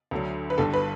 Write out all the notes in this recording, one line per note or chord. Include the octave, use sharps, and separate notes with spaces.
D2 D3 F#3
B4
G1 G2 D3 G3 A4
B4